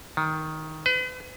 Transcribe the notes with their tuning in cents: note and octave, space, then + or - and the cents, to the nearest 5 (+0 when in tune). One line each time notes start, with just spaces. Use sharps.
D#3 +10
B4 +40